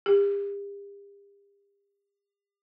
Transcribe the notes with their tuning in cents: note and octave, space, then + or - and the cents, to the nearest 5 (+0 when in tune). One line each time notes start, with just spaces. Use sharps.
G4 +40